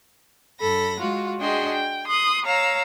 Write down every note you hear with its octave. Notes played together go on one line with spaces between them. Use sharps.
F#2 A4 B5 A#6
G#3 F4 F#4
D4 F#4 G#4 D#5 G5 C6
G5
C6 D#6 F#6
C#5 F5 A#5 E6